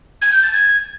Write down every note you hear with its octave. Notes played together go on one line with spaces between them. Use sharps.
G#6
G6
A6
G#6